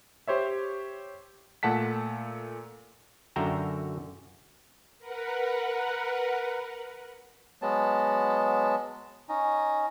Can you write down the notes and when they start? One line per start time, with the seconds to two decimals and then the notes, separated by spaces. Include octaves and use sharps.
0.28 G4 C5 C#5 E5
1.63 A#2 A3 F#5 A5 B6
3.36 F#2 D3 F#4 E5 G5 A#5
4.99 A#4 B4 F#5
7.62 F#3 G#3 B3 A5
9.29 C#4 D#4